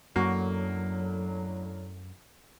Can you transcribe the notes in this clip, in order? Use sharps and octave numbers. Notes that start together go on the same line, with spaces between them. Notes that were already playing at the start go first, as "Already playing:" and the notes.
F#2 A2 D3 F#3 A#3 F#4